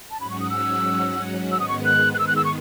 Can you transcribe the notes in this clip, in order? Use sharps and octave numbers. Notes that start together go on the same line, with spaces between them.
A5
G#2 F#3 C#4 F#4 B5
C#6
D#6
E6
G#2 D#3 G#3 B3 E6
D#6
C#6
F#6
F#6
E6
F#6
E6
C#6